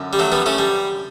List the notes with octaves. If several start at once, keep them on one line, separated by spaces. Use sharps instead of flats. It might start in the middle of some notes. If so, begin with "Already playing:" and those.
Already playing: F#2 D3
G3
F#3 A3
G3 B3
A3 C#4
G3